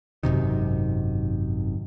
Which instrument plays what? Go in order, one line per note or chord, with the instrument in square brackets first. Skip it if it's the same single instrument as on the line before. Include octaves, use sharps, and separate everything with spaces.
[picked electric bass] G#1 F#2 C3 D#3